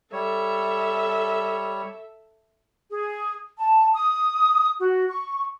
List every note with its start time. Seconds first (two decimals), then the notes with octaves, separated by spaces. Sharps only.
0.13 G3 A4 C#5 E5
2.91 G#4
3.59 A5
3.94 D#6
4.79 F#4
5.08 C#6